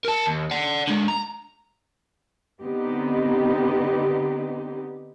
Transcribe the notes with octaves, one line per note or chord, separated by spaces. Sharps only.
A#4 A5
D#2
D5 F#5
D3 G#3
A#5
D3 B3 C4 D#4 G4